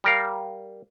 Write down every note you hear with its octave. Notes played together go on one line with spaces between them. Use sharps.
G3 A#4 F5